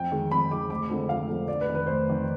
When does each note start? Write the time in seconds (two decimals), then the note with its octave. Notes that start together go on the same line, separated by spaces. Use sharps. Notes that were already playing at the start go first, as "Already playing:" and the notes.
Already playing: F2 G5
0.12 D#3 G#3
0.31 F2 B5
0.51 D#3 G#3 D6
0.70 F1 D6
0.89 F2 D3 F3 G#3
1.09 F1 F5
1.28 F2 D3 F3 G#3
1.48 F1 D5
1.61 B4
1.68 F2 D#3
1.75 B4
1.87 F1 C5
2.07 F2 D#3